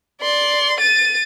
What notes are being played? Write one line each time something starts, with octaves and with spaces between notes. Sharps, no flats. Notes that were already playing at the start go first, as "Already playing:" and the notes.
D5 C6
A6 D#7